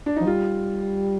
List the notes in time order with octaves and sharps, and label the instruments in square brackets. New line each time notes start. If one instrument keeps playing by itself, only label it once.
[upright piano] D4
[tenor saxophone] F3 [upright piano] D#4
[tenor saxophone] G3 [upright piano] F4